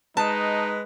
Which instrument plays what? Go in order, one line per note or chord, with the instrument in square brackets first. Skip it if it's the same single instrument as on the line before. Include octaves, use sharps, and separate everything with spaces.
[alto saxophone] G#3 [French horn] D#4 [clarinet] B4 [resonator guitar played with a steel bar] A5